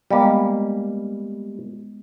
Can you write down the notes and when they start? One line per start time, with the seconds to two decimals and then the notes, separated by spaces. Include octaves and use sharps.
0.11 G3 G#3 A#3 B3 D#5